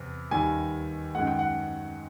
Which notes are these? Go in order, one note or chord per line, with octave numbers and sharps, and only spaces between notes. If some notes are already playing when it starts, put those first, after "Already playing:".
Already playing: E2 C3
D#2 D#3 G3 G#5
F#2 D#3 G#3 F#5
G5
F#5